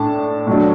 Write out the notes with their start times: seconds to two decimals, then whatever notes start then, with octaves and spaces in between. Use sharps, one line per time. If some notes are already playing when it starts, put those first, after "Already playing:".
Already playing: A2 A3 D4 A5
0.47 A2 F#3 D4